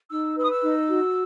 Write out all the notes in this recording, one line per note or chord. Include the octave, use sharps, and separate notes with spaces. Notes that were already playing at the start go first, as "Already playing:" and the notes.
D#4 E6
B4 E6
D#6
E6
D#4
F#4